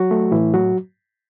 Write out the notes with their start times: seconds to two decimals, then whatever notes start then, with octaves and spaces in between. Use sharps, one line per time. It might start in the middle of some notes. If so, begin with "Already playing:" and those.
Already playing: F#3 F#4
0.11 A3
0.32 A2 E3 E4
0.54 F#3 F#4